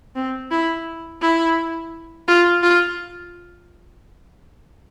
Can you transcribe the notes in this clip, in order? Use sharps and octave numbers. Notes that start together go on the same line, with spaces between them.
C4
E4
E4
F4
F4